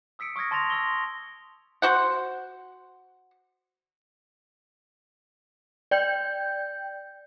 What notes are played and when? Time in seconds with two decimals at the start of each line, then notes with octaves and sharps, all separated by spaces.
0.19 D#6 E6 B6 C#7 D7
0.36 C#6 D#6 F6 G#6 A#6
0.51 A5 C6 A6 A#6 F7
0.70 C6 E6 G7
1.82 F#4 C5 F#5
5.91 D5 G5 G6